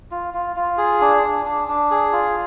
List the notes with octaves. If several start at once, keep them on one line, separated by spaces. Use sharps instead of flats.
F4
F4
F4
G#4
D4
D4
D4
D4
G#4
F4